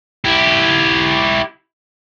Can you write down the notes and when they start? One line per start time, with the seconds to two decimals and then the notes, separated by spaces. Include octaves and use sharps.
0.24 E4 G4